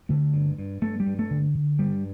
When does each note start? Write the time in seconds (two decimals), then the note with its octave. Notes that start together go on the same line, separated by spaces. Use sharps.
0.09 D3 A3
0.34 G2
0.58 G2
0.82 G2 A3
1.00 G3
1.06 G2
1.19 A3
1.30 D3
1.55 D3
1.79 G2 G3